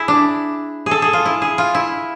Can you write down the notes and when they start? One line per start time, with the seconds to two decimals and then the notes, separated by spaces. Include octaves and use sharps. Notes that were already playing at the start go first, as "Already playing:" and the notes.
Already playing: E4 G#4
0.08 D4
0.86 G#4 A4
1.02 G#4
1.13 F4
1.25 E4
1.42 G#4
1.58 F4
1.75 E4